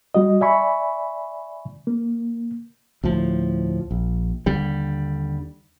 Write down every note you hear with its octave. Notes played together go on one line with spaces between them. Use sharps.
G3 F#4 D#5
D5 E5 G#5 B5 C#6
A#3
D2 A2 F3
A#1
D#2 D3 G3